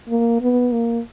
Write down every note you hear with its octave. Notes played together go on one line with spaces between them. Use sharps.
A#3
B3
A#3